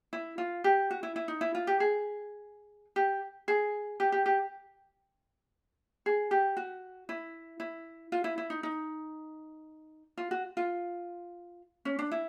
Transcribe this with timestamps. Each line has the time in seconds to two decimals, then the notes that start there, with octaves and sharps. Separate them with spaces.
0.13 E4
0.38 F4
0.64 G4
0.91 F#4
1.03 E4
1.16 E4
1.28 D#4
1.41 E4
1.55 F4
1.67 G4
1.80 G#4
2.96 G4
3.48 G#4
4.00 G4
4.12 G4
4.26 G4
6.06 G#4
6.31 G4
6.57 F#4
7.09 E4
7.60 E4
8.12 F4
8.24 E4
8.38 E4
8.50 D#4
8.63 D#4
10.17 F4
10.31 F#4
10.57 F4
11.85 C#4
11.99 D4
12.11 E4